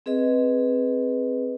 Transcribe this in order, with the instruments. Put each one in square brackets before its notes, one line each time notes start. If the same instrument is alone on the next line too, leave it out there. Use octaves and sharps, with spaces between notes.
[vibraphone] C4 G#4 B4 D#5